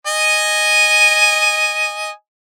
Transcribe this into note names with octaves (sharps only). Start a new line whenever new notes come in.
D#5 G#5